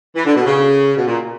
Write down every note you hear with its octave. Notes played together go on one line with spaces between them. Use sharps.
E3
D3
B2
C#3
B2
A#2